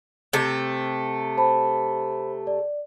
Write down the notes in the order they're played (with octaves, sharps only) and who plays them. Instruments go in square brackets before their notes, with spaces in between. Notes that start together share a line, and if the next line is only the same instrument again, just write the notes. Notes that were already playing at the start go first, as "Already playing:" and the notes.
[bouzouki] C3 A3
[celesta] C5 A5 B5
D5